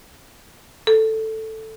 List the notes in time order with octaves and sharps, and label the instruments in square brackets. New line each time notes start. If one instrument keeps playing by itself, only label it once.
[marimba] A4